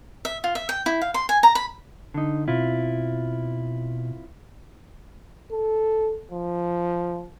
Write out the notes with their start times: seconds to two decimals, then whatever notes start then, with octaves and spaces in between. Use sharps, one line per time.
0.25 E5
0.44 F4
0.55 E5
0.69 G5
0.86 E4
1.02 F5
1.14 C6
1.29 G#5
1.43 A#5
1.55 B5
2.14 D3 D#4
2.48 B2 C4 E4 F4
5.51 A4
6.31 F3